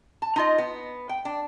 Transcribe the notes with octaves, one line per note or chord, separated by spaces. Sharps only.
A5
D#4 F4 D#5
B3
G5
D4